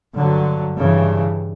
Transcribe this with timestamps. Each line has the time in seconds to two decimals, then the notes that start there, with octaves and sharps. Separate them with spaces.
0.17 G2 D3 F#3
0.78 G2 C#3 E3